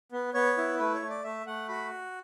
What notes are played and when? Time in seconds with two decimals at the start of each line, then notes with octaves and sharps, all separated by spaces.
0.12 B3
0.34 B3 C#5
0.58 E4
0.79 A3 B4
0.94 C#5
1.02 A3
1.10 D5
1.24 A3 E5
1.46 A3 F#5
1.69 F#4 B5